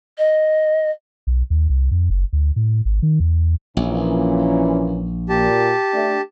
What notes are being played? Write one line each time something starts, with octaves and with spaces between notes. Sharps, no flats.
D#5
B1
D#2
C2
F2
F#1
D2
A2
G#1
D#3
E2
A#1 A#2 E3 C#4
A#2 G4 A5
A3 D4